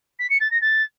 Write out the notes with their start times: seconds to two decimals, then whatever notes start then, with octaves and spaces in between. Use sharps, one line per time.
0.19 B6
0.29 C#7
0.40 A6
0.50 A#6
0.61 A6